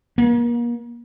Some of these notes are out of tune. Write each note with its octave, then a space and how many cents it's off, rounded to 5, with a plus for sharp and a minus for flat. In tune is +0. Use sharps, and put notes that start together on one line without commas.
A#3 +35